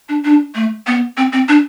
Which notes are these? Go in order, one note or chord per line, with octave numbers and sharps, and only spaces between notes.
D4
D4
A3
B3
C4
C4
D4